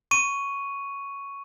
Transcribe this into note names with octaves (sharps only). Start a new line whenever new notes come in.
C#6 D#7